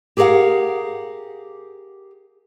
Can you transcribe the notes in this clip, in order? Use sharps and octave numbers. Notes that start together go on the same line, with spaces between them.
G4 G#4 A#4 C5 F5 F#5